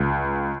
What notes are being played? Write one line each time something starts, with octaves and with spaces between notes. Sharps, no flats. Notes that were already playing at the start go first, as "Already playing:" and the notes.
Already playing: C#2